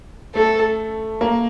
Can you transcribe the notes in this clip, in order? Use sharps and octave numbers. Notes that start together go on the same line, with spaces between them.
A3 A4
A#3